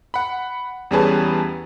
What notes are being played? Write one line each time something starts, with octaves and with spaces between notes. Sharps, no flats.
F#5 B5
E2 G3 C#4 G#4 B4 A5